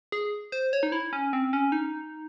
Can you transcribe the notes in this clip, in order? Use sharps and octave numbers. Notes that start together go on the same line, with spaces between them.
G#4
C5
C#5
D#4
E4
C#4
C4
C#4
D#4